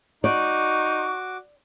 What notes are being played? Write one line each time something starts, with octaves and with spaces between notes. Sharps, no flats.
D#4 F#4 D5 C#6 D6